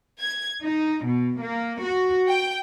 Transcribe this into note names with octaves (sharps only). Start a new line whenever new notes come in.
G#6
D#4
B2
A#3
F#4
G5